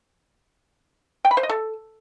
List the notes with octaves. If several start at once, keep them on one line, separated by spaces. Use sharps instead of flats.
G5
B5
C5
D#5
A4